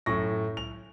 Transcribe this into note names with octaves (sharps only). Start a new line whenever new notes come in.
F#2 A2 C#6 A#6
F7